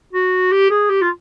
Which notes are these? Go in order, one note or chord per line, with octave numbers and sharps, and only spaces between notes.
F#4
G4
G#4
G4
F4